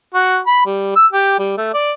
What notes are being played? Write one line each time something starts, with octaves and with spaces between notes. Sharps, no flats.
F#4
B5
G3
E6
G4
G3
A3
D5